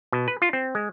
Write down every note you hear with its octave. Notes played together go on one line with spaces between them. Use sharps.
B2
B4
F4
C4
G#3